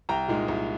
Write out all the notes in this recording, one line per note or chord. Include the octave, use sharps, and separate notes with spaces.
C2 G5 A#5
A#2 G#3 D#4
C2